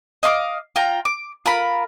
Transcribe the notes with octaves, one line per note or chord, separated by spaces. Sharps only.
D#5 F5 C6 D6
F4 G5 A#5
D6
F4 A#4 B5